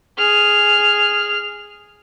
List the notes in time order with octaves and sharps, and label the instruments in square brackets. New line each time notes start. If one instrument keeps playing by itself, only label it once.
[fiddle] G#4 F6